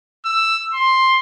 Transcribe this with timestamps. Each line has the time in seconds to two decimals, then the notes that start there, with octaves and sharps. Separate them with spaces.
0.25 E6
0.74 C6